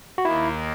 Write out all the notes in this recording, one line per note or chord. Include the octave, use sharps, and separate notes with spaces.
F#4
D#2 D#3 A#3 E4